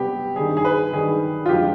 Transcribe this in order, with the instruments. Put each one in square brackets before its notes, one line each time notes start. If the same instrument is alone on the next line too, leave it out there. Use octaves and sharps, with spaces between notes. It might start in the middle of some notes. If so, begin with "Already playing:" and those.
Already playing: [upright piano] C3 G3 B3 G4
G2 D#3 G3 G#4
G#4
B4
G2 D#3 G3 G#4
F4
F2 D3 F3 G#3 G4